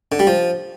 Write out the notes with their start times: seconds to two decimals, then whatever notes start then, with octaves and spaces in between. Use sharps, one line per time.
0.12 D3
0.19 G3
0.27 F3